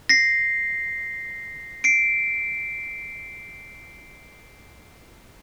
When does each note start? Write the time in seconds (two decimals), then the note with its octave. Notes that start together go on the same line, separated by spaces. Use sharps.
0.09 A#6 C7
1.84 C7 D7